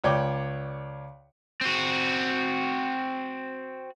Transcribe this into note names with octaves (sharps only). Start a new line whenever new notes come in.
C#2 C#5 D5 G5 D6
C4 F#4